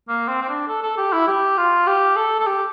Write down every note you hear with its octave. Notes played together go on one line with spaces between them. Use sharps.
A#3
C4
C4
D4
A4
A4
G4
E4
G4
F4
G4
A4
A4
G4